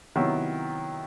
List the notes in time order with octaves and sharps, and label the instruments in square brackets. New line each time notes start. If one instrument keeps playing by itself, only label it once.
[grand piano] C3 D#3 F#3 B3 E4